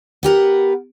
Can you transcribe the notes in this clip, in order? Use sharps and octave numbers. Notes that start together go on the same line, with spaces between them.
B3 G4 A#4 F#5